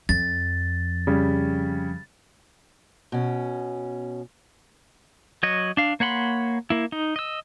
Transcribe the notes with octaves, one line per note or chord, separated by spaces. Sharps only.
F2 A6
C#3 G3
B2 C#4
F#3 C#5 D#5
D4 F5
A#3 C#5 F#5 B5 C6
A#3 E4
D#4
D#5 E6